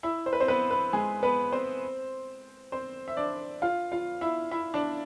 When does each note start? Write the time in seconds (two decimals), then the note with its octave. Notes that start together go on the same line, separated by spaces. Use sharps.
0.03 E4 E5
0.26 C5
0.33 B4
0.40 C4 C5
0.48 B3 B4
0.71 B3 B4
0.93 G#3 G#4
1.23 B3 B4
1.52 C4 C5
2.72 C4 C5
3.08 E5
3.17 D4 D5
3.62 F4 F5
3.92 F4 F5
4.21 E4 E5
4.51 E4 E5
4.74 D4 D5